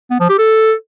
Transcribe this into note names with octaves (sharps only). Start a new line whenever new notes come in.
B3
F3
G4
A4